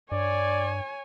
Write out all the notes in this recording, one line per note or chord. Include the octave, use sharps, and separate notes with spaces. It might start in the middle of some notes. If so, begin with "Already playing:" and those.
G2 C#5 D5 G#5